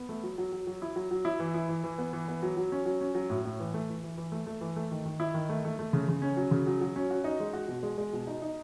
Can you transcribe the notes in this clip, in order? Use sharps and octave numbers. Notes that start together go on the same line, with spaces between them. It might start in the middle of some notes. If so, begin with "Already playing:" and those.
Already playing: B3
A3
F#3
F#3
F#3
F#3
E4
F#3
F#3
E4
E3
E4
E3
E3
B3
E3
B3
F#3
F#3
C#4
F#3
C#4
F#3
A2
A2
E3
A3
E3
E3
E3
A3
A3
E3
A3
D#3
D#3
E4
D#3
A3
A3
A3
C#3
C#3
C#4
F#3
C#3
F#3
F#3
C#4
F#4
D#4
G#3
F#4
B2
G#3
G#3
B2
D#4
D#4